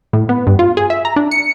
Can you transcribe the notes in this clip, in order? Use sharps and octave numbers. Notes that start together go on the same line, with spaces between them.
A2
B3
G2
F4
G#4
E5
A#5
D4
C#7